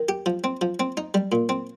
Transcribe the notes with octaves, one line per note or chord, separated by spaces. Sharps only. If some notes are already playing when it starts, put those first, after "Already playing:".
Already playing: D#3
G4
F3
C4
F3
C4
D#4
G3
A#2
C4